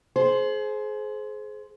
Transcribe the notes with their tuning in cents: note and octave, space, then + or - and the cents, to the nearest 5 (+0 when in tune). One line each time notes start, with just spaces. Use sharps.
G#4 +35 C5 +0